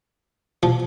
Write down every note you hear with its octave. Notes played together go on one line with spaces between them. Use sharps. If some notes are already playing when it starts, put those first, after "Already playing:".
F3